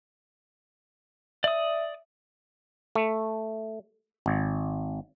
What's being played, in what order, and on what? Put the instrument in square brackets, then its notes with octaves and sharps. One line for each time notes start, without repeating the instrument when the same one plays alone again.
[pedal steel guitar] D5 D#6 [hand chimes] E5
[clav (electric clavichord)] A3
G#1